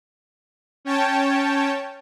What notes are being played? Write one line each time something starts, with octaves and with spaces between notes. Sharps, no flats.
C#4 C#5 G5 A5